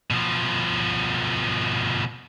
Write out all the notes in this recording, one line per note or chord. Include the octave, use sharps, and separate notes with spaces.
B2 F3